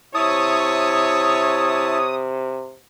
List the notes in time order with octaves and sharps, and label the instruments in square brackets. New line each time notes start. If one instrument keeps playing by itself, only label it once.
[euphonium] C3 [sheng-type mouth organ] E4 A5 [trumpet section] C#5 [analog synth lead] D#6